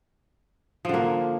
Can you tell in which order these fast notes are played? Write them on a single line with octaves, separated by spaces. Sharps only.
F3 D3 A#3